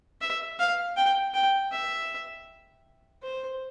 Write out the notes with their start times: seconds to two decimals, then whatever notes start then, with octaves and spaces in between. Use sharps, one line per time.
0.21 E5
0.59 F5
0.96 G5
1.34 G5
1.72 E5
3.23 C5